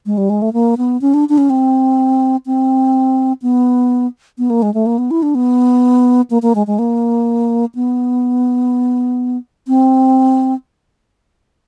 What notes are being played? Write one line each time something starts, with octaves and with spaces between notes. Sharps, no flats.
G#3
G3
G#3
A3
A#3
B3
C#4
D4
D4
C#4
C4
C4
B3
B3
A#3
G#3
A3
A#3
B3
E4
D4
B3
A#3
A#3
G#3
G#3
A#3
B3
C4